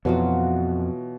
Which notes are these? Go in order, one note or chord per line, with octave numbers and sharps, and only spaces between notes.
F2 B2 E3 F#3 F4 F#4